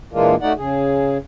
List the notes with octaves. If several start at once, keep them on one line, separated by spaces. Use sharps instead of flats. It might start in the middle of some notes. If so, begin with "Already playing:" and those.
A#2 E3 G#3 A#3 D4 F4
A3 D#4 F#4 D5 F#5
C#3 G#4